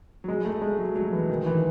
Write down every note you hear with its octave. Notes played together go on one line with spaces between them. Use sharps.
F#3
G#3
A3
G#3
F#3
F#3
E3
D#3
E3